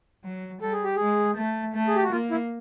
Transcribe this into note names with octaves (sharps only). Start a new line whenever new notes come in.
F#3
G3 A4
G#4
G4
G#3 G#4
A3
A3
G#4
G4
F#4
A#3 F4
E4